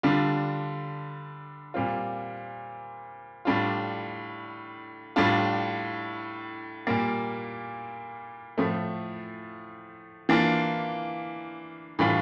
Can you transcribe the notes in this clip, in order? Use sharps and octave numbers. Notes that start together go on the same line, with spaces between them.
D3 G3 D4 F4
A#2 G3 C4 F4
A2 G3 D4 F4
A2 G3 D4 F4
A#2 G3 A#3
A2 F3 A3
E3 A#3 D4 F4
A2 E3 G3 D4 F4